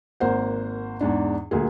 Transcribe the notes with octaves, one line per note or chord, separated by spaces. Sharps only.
G#1 A#3 C5 F#5
E2 G#2 D4
D#1 D2 A#3 G#4